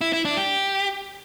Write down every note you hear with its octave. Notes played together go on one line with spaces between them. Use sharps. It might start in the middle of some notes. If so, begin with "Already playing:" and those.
E4
E4
D4
G4